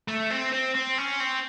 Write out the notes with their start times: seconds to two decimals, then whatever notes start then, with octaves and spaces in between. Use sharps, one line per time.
0.08 A3
0.30 C4
0.52 C4
0.75 C4
0.98 C#4
1.20 C4